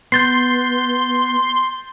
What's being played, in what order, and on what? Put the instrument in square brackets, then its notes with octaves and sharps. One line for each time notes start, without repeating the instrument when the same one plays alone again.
[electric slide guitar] B3 [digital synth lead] C6 [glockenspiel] G6 A6 C7